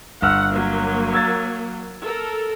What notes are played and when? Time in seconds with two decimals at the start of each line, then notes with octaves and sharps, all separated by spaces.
0.22 G1 F#5 E6 F6
0.53 F#3 A#3
1.13 E6 G#6 A6
2.04 A4 A#4